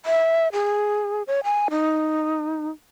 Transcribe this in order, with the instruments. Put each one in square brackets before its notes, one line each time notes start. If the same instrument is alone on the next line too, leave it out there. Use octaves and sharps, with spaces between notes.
[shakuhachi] E5
G#4
C#5
G#5
D#4